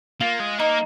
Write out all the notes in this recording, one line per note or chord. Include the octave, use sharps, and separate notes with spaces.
A#3 F4
G#3
A#3 D#4